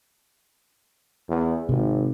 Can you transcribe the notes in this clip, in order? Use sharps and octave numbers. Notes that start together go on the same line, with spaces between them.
E2
G#1 C3